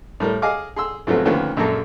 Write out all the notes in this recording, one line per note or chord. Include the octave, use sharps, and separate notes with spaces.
A2 G3 A#4
G#4 D#5 F5 G#5 D6 F6
G#4 C6 E6
G#2 C3 F3 F#3 A3 B3
D2 D#3 F3 A#3 B3 C#4
A#1 F#2 G#3 A#3 A4 A#5